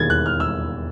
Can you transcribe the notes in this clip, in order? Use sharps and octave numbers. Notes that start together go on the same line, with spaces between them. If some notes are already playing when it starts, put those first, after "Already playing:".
Already playing: E1 D#2 D#3 G#6 A6
F#6
F6
E6